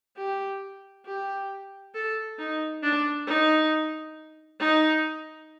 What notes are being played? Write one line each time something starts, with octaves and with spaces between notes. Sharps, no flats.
G4
G4
A4
D#4
D4
D#4
D#4